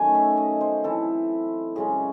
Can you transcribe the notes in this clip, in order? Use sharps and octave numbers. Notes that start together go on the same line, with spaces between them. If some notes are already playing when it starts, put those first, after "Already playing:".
Already playing: D#3 F#3 A3 C#4 G#5
E5
D#5
C5
E3 C4 E4 A4
F#2 C#3 G#3 C#4 G#4